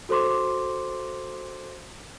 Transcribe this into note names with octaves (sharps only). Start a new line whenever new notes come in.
F#4 A4 C5 C6 D6